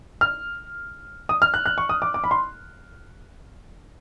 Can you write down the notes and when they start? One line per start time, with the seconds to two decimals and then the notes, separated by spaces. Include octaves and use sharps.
0.21 F6
1.29 D#6
1.42 F6
1.54 F#6
1.66 F#6
1.78 C#6
1.89 D#6
2.02 D6
2.14 D6
2.24 B5
2.31 C6